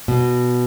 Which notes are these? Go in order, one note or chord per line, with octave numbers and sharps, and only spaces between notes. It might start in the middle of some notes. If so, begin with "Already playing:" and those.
B2